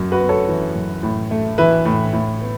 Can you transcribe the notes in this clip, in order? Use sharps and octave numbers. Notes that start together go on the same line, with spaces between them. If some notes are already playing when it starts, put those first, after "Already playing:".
Already playing: F#2
F#4 B4
B3
A4 C#5
E3
F#2
A2
A3
E3 B4 E5
A2
A2
B3